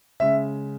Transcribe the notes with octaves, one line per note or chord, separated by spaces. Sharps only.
C#3 G#3 E5